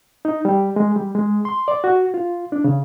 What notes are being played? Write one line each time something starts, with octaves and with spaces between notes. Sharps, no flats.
D#4
G3
G#3
G3
G#3
C6
D5
F#4
F4
D4
C#3